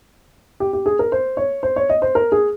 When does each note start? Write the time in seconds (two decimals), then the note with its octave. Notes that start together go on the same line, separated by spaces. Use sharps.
0.60 G4
0.73 G4
0.86 G#4
0.99 A#4
1.12 C5
1.37 C#5
1.63 C5
1.76 C#5
1.89 D#5
2.02 C5
2.15 A#4
2.32 G#4